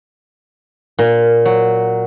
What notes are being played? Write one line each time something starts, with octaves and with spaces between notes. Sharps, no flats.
A#2
F#3